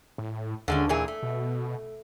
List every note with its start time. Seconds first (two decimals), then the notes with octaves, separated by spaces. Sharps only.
0.18 A2
0.68 D#2 D3 G#3 C#4
0.89 A#2 E3 G#4
1.08 A3
1.23 B2